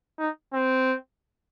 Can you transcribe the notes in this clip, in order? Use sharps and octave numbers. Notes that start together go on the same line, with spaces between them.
D#4
C4